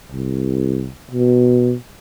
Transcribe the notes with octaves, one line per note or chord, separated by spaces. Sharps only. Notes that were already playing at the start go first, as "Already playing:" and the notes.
C2
B2